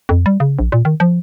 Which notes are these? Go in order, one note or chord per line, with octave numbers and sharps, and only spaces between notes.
F2
G3
C#3
A#1
A#2
D#3
F3